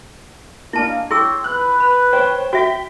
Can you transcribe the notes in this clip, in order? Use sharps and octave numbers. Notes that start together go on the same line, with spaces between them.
G#3 A#3 D4 E4 F5 A5
E4 G#4 C#5 G5 C6 E6
B4 F#6
B5
C5 C#5 G5
F#4 E5 G5 B6